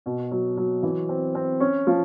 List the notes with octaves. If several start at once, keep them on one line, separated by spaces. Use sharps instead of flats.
B2
F#3
F#3
E3
C4
C4
C#4
F3